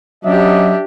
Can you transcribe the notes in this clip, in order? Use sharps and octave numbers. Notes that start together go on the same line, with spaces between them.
F#3 C#4 D4 G4 D#5 E5